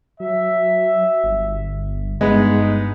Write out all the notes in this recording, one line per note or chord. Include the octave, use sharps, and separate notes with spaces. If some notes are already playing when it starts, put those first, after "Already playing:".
F#3 E5
G1
G2 G#3 B3 D#4